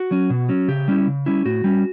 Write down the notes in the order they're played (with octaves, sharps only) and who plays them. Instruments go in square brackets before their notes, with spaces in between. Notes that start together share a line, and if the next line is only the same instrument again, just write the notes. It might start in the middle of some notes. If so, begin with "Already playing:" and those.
Already playing: [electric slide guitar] F#4
F#3 C#4
B2
F#3 C#4
C#3 G4
G3 C#4 E4
C#3
G3 C#4 E4
A2 F#4
G3 C#4